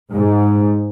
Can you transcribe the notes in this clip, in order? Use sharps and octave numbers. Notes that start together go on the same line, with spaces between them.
G#2